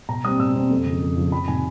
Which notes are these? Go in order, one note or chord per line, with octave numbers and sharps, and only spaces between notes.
B2 A#5
G3 C4 D#6
B2 E6
G3 C4
F2
C#3 F3
F2
C#3 F3
F2 B5
C3 D#3 G#5